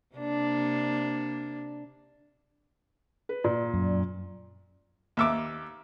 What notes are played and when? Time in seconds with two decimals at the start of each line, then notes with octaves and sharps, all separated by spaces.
0.15 C3 A#3 D4
3.29 B4
3.44 A#2 D5
3.74 F#2
5.17 D#2 E5 D6